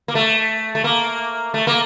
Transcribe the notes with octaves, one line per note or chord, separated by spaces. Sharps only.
A#3
A3
A3
A#3
A3
A#3